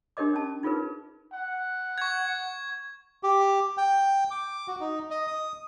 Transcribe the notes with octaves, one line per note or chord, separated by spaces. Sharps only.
D4 G4 A#4 D#5 D6
C#4 A5
D#4 F4 G#4 A#4 B4
F#5
C#6 G#6
G4
G5
D6
F#4
D#4
D#5
D#6